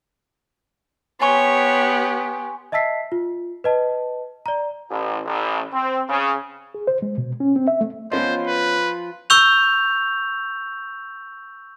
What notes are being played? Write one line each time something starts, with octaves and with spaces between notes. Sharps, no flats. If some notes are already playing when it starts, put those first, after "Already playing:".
B3 G4 C#5 G#5 C6 C#6
D#5 E5 A5 E6 B6 C7
F4
B4 D#5 A5
D5 A#5
A1
A1
C4
C#3
G#4
C5
G#3
B2
C#4
C4
E5
A3
F3 B3 C#4 C5 D#5
B4
C#6 E6 G6 F7